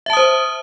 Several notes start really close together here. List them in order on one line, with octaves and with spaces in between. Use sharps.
E5 A5 D#6 C5